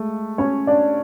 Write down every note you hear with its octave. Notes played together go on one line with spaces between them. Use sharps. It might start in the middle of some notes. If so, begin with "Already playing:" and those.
Already playing: G#3 A3
C#4 C#5
D4 D5